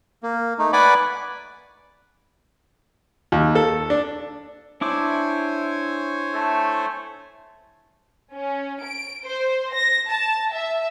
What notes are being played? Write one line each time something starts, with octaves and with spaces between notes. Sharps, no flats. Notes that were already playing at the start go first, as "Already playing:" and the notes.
A#3
A3 D#4
B4 D5 F#5 G#5 B5 D6
D#2
A4
D4
D4 E4 C5 C#5 G#5 D6
A3 A4
C#4
D7
C5
A#6
A5
E5